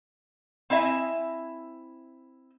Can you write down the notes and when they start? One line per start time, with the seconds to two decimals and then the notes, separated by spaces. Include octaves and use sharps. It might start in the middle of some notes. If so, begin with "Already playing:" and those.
0.70 C4 E4 D#5 E5 G#5